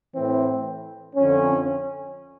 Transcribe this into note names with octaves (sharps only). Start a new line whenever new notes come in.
A2 E3 C4
F2 D3 C#4